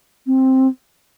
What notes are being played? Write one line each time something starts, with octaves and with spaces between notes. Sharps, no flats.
C4